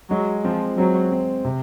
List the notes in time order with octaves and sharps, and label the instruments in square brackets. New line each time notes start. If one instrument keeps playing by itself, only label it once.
[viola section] F#3 [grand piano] G#3
[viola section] F3 [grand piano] C4
[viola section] F#3 [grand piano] C4
[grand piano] C4
C3